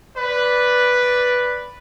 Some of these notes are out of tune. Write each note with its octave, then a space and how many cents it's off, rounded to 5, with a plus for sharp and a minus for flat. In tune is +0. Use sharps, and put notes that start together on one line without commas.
B4 +0 D5 +0